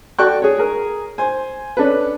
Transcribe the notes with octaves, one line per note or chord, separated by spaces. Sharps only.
F#4 A4 D5 G5 C#6 F#6
G#4 C#5
G#4 A#4
C5 G#5
C#4 D4 A4 B4